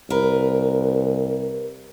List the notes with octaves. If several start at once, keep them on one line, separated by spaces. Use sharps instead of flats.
C2 A#4 B4